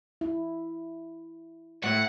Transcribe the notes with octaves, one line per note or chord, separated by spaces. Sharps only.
E4
A2 F#5